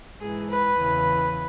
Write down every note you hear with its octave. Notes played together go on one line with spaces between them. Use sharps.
G#2 E3 G#4
B4
E2 C#3 E3